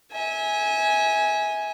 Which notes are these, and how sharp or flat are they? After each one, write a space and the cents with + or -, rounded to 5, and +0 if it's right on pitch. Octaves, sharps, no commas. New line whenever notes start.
E5 -30 G#5 +0